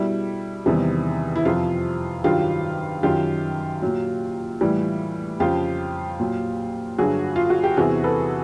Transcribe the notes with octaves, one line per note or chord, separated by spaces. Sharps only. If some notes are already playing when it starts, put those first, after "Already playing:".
Already playing: B2 G3 E4
E2 C3 D#3 G3
E4
F2 C3 F3 F4
G2 D#3 F#3 F4 G4
F#2 D#3 F#3 F4 G4
A#2 F#3
A2 E3 G3
F2 C#3 F3 F4 G4
A#2 F#3
G2 D3 F#3 F#4 G#4
F4
F#4
G4
E2 C3 E3 F#4 G#4
A4 B4